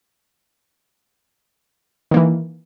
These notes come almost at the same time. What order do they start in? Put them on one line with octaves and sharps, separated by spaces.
D#3 A#3 E3